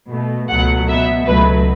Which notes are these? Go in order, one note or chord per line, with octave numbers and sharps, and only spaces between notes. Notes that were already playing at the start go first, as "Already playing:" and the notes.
B2 A3
C#2 B2 F#3 A3 F#5
B2 B3 E5
C#2 B2 F#3 A3 B4